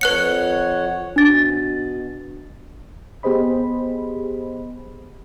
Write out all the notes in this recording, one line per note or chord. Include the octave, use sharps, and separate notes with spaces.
F2 B4 C#5 F#5 F#6 C#7
B2 D4 A6
B3 G4 G#4 C5 D#5 B5